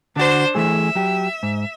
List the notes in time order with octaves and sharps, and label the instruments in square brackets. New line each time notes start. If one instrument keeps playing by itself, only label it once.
[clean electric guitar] D3 F#4 [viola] D4 C5
[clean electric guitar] E3 A3 G#4 [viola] E5
[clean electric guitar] F#3 G4
G#2